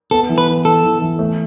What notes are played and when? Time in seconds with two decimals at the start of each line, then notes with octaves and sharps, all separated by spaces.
0.11 B3 A4
0.29 E3
0.38 B4
0.47 E3
0.65 E3 A4
0.83 E3
1.02 E3
1.19 A3